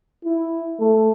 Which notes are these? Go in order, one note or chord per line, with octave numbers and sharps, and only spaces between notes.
E4
A3